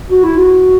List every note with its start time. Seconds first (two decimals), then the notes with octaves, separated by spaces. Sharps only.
0.10 F#4
0.24 E4
0.37 F#4